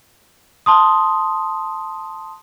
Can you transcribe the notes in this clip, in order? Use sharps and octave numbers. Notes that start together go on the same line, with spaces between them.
A5 C6 D#6